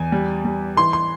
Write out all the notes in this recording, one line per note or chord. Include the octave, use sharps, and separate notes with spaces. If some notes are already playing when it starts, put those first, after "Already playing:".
Already playing: E2 G#5
G3
G3
E3 C6
C6